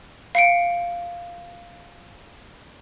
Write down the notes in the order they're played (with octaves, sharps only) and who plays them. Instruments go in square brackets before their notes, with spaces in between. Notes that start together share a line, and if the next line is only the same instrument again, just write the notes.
[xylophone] F5 C#7 D7